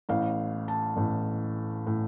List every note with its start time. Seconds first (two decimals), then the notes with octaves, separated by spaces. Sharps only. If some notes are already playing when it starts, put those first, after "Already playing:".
0.09 A1 A2 F5
0.68 A5
0.96 A1 A2
1.87 A2